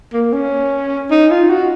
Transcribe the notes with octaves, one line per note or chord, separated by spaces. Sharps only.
A#3
C#4
D#4
F4
F#4